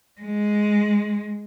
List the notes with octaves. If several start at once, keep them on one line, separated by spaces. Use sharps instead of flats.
G#3